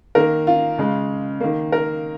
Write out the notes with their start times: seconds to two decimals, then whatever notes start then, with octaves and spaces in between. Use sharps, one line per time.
0.15 D#3 A#3 A#4
0.47 F4
0.78 C#3 G#3
1.41 D#3 A#3
1.72 A#4